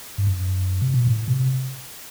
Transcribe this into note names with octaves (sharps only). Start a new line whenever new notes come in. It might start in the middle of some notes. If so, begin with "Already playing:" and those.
G2
F#2
C3
B2
A2
C3